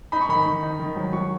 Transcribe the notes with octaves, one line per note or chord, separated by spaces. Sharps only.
D#4 B5
C#6
D#3 B5
D#3
D#4
D#3
F#3
F#3 C#6